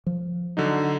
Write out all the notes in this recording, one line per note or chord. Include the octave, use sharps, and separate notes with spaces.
F3
D3 F#3 D#4